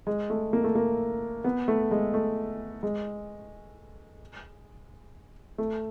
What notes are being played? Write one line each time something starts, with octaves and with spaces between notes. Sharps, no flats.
G#3
A3
A#3
A3
A#3
B3
A3
G#3
A3
G#3
A3